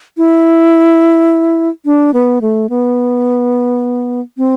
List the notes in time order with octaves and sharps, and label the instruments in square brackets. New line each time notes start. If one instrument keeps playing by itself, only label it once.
[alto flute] E4
D4
B3
A3
B3
C4